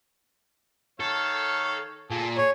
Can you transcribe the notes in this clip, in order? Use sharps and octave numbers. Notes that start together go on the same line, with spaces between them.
D#3 A4 C#5 F5
A#2 G#4 A4
G#4 C#5